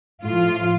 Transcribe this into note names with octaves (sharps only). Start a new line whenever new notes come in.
A2 F3 F4